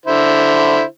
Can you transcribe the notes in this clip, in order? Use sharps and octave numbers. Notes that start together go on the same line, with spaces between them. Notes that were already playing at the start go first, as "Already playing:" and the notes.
D3 E4 C5